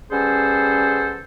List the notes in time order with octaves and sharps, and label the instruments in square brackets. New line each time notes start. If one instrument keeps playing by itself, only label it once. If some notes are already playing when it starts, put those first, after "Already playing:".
[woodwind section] G3 B3 C#4 G#4 A4 C5